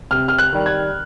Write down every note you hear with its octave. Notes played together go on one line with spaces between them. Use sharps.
C3 F6
F6
F#6
D#3 G3
G#6